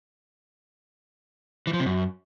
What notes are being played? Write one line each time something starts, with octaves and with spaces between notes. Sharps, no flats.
E3
F3
C3
F#2